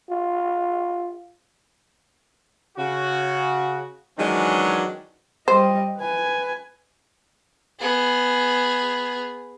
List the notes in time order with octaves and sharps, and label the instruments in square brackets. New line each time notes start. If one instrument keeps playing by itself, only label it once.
[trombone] F4
[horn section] C#3 F#4
D#3 E3 F#3 G#3 C#4 D4
[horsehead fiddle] G3 D#5 [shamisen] C5
[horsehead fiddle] B4 G#5
[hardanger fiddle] B3 G#4